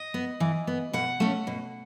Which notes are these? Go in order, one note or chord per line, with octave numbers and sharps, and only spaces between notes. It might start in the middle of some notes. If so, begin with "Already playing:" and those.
Already playing: D#5
B3
E3
B3
B2 F#5
A3 C#4
B2